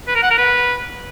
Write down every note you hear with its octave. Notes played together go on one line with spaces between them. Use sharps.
B4
A#4
F#5
A#4
B4